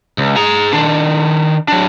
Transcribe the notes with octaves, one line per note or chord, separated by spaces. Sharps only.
C#2
G#4 A#5
D#3 D4
F#3 D4